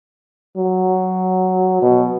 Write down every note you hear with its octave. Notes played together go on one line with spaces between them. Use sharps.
F#3
B2